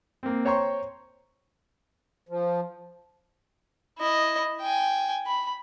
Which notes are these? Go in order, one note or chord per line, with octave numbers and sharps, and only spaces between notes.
A#3 C4
C5 C#5 G5 A#5 C6 C#6
F3
E4 D#5
G5 G#5
B5